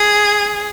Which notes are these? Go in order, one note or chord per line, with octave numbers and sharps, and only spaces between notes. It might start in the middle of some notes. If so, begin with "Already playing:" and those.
Already playing: G#4